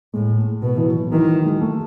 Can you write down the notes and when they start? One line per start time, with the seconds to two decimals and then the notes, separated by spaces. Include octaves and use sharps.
0.14 A2 G#3
0.38 A3
0.63 B2 B3
0.77 E3
0.88 F#3
1.12 D#3 E3
1.29 F#3
1.45 G#3
1.62 A3